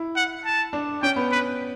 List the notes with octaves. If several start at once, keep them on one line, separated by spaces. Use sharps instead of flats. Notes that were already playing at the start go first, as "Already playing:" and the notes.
Already playing: E4
F#5
A5
D4
C#4 G5
B3
B4